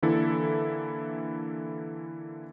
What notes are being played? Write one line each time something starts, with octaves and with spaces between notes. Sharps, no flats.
D3 E3 A#3 E4 A4